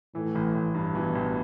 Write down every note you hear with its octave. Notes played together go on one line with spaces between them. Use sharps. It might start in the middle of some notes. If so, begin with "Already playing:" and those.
A2 E3
A1
A1
G2
B2 E3
A1